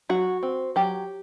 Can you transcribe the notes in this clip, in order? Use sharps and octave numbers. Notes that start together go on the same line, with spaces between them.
F#3 F#4
C4
F#3 G4